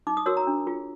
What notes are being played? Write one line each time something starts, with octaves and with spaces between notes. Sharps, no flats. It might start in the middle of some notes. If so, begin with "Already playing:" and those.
D#4 D6
D#6
F#4 A#4 C#5 E6
A#5
D4
F4 G#4